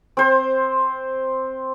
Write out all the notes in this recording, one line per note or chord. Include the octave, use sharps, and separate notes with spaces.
C4 C5 C6